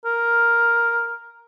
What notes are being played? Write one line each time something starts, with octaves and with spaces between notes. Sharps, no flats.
A#4